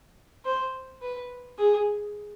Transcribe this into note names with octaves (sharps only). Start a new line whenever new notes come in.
C5
B4
G#4